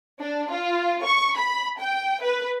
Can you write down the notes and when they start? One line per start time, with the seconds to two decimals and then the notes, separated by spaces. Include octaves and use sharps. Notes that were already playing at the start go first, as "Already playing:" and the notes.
0.20 D4
0.51 F4
1.05 C#6
1.36 B5
1.79 G5
2.22 B4